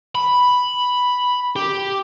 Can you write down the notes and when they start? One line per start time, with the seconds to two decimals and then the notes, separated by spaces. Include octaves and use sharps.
0.15 B5
1.56 G4